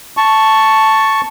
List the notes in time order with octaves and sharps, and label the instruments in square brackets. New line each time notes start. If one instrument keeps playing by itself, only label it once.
[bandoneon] A5 C#6